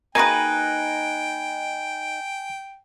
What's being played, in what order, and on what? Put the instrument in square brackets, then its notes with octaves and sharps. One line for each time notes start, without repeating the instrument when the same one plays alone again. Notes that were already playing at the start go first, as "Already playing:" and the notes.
[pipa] A#3 F#4 G#4 [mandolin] D#4 B4 [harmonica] G5 [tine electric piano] G#5